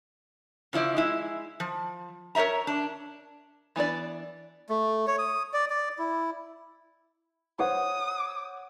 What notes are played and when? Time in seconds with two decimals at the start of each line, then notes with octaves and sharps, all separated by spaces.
0.73 C#3 F3 E4 D5
0.97 G#3 E4
1.60 F3
2.35 A#4 C#5 D#5 E5 A#5
2.67 D4
3.76 E3 B3 D4 D5
4.69 A3
5.07 C#5
5.19 D#6
5.53 D5
5.70 D5
5.99 E4
7.59 C5 C#5 F#5 D#6